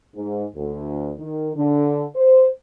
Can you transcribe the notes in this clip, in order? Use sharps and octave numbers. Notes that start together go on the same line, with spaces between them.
G#2
D2
D#3
D3
C5